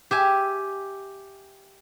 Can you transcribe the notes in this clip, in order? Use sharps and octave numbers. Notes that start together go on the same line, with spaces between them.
G4 E5 G#5